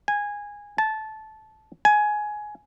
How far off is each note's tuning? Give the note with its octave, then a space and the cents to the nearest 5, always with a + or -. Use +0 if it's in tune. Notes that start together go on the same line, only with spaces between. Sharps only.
G#5 -15
A5 -15
G#5 +15